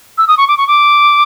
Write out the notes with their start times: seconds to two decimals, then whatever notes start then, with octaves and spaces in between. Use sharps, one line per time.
0.18 E6
0.28 D#6
0.38 C#6
0.48 D6
0.57 C#6
0.68 D6